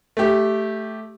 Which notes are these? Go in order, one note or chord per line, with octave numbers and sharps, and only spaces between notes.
A3 G4